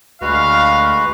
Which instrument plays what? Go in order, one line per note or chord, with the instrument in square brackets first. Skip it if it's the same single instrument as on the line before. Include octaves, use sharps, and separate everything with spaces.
[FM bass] D2 [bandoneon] G#3 F#4 B4 [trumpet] F5